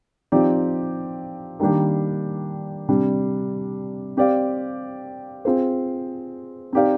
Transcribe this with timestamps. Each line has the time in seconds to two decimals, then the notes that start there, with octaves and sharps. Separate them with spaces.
0.32 F3 C4 D#4 G4 D5
1.60 D#3 G3 A#3 D4 G4
2.88 C3 G3 D4
4.17 C4 G4 D5 F5
5.45 C4 F4 G#4 C5
6.73 C4 D#4 G4 D5 F5